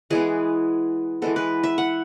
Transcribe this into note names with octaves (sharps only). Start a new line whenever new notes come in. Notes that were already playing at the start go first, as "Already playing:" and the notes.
E3 G#3 B3 G#4
E3 G#3 B3 A4
B4
E5
F#5